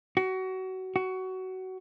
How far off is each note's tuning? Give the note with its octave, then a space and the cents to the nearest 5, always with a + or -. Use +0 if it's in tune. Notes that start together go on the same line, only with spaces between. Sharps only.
F#4 +25
F#4 +20